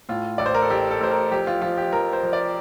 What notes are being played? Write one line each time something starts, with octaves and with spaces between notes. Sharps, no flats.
A2 F4
A1 D5
C5
A#4
A4
A1 G4
A4
A1 C5
A#4
F3 G4
F4
F3 F4
G4
F3 A#4
C5
F3
D5